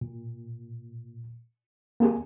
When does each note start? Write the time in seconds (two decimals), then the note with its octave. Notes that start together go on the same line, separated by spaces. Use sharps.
0.01 A#2
2.00 A#3 C4 G4 G#4 G#5